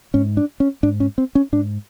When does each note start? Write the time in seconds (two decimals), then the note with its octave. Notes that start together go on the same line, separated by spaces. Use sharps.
0.14 G#2 C#4
0.37 D4
0.60 C#4
0.83 G#2 D4
1.00 C#4
1.18 C4
1.35 C#4
1.52 G#2 D4